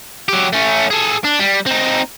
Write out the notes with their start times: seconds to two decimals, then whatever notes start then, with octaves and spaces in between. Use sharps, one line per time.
0.28 F#3 G4
0.53 A3 C#4
0.90 G#4 A4
1.24 D4
1.39 G3
1.66 C4 D#4